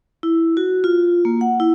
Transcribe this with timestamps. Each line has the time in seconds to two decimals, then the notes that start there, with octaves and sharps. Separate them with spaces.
0.23 E4
0.57 F#4
0.84 F4
1.25 A#3
1.41 F#5
1.60 E4